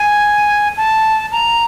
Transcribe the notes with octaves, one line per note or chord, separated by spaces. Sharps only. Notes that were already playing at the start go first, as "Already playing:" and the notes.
Already playing: G#5
A5
A#5